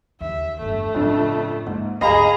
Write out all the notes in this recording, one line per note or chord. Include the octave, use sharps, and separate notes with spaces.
D#2 D#3 E5
G1 E2 A3
F2 A2 C#3 D4
G#2 A#3
G1 C#2 G#4 D#5 F5 A#5 B5